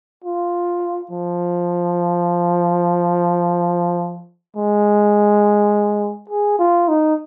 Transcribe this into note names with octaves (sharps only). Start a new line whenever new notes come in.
F4
F3
G#3
G#4
F4
D#4